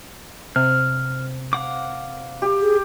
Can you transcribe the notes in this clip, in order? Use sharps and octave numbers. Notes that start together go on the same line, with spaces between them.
C3 F6
F5 F#5 D6
G4
G#4